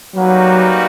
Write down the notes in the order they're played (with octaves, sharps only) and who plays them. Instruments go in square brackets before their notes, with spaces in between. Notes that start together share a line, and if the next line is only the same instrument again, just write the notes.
[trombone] F#3 [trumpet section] G3 A#3 D#4 F#4 B4